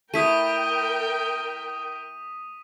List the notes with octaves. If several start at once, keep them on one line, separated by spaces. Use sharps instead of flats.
A3 E4 A#4 G5 D#6 B6 D#7